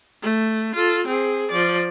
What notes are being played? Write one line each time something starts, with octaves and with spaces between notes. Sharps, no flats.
A3
F4 A4
C4 G#4
F3 D5